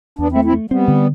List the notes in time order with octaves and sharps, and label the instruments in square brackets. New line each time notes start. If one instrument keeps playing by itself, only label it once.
[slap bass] E2 [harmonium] B3 D4
[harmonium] C4 E4
[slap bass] A3
[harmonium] C4 E4
[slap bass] A3
[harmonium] G3 B3 [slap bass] C4
[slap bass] D3